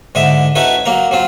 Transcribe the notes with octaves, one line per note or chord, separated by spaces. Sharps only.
G#2 D3 D#5 E5
C#4 D#4 E4 F#4 A4 B4
F#3 A#3 A#5
F#3 C4 F4